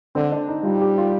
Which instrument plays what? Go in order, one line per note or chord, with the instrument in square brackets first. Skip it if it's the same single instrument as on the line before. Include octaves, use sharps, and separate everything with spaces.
[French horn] D3 [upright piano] C4
[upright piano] D4
D#4
[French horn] G3 [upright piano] F4
[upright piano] G4
F4